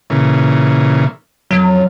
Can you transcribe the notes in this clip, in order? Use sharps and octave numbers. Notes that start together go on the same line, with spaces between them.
A#2 C#3 E3
F2 F#3